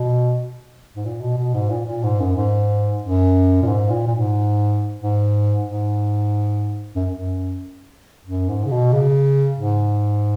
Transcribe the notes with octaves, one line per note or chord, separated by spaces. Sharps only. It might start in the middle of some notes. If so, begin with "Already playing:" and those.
Already playing: B2
G#2
A#2
B2
B2
G#2
A#2
A#2
G#2
F#2
G#2
F#2
A#2
G#2
A#2
A#2
G#2
G#2
G#2
F#2
F#2
F#2
G#2
C#3
B2
C#3
G#2